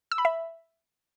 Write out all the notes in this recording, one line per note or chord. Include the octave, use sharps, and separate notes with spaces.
E6
B5
E5